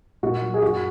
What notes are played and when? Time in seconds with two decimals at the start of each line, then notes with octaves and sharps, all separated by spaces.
0.23 A#2 F#4
0.42 F#3
0.54 G#4
0.62 F#2 F#4